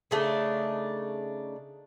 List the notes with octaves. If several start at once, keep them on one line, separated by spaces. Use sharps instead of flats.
C#3 A3 D4 D#4